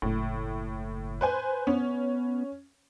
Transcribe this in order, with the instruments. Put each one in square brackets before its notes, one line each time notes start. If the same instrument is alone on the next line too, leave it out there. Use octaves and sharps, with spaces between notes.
[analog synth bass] F#1 [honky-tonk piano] A2
[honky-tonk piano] B4 C5 G#5
[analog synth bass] B3 [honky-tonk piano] C#4